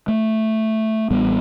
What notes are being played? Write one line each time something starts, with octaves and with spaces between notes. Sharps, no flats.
A3
A1 G3 B3